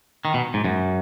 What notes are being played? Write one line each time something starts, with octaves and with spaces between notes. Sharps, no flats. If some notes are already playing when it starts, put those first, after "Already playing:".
D#3
B2
G#2
F#2